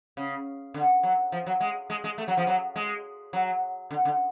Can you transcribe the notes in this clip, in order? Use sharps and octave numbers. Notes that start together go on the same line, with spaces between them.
C#3
D3
F#3
F3
F#3
G#3
G#3
G#3
A3
F#3
F3
F#3
G#3
F#3
D3
D3